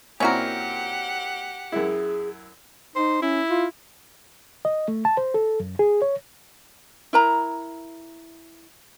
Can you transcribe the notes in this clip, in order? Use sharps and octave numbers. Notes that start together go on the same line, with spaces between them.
A#2 C4 C#4 E4 F#4 G4 A#4 F#5
F#2 E4 G#4
D#4 C5
C#4 E4
F4
D#5
A3
A5
C5
A4
F#2
G#4
C#5
E4 A#4 A#5